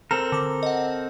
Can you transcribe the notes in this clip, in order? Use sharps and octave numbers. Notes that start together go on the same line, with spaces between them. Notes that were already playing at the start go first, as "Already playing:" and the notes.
C4 A4 A#4 A#5
D3 D6
D#5 F#5